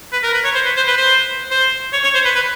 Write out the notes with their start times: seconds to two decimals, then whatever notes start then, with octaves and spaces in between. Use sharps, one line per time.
0.13 B4
0.23 A#4
0.33 B4
0.44 C#5
0.55 C5
0.65 B4
0.76 C5
0.87 B4
0.97 C5
1.51 C5
1.93 C#5
2.03 C#5
2.14 C5
2.25 B4
2.35 B4